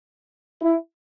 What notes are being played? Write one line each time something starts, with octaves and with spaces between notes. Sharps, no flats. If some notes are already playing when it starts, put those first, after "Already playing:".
E4